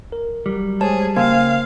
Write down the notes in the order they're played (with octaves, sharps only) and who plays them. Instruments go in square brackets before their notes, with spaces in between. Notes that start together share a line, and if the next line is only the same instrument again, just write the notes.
[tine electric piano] A#4
[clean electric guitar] F#3 G3
[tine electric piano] G#3 C5 C#5 [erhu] G#4 [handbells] A5
[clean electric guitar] C#3 G5 G#5 [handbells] A#3 [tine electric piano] C5 [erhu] F5